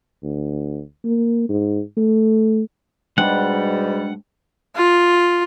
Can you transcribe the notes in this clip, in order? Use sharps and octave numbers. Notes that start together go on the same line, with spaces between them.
D2
A#3
G#2
A3
G#2 B2 G3 G#3 D4 F#5 G5
F4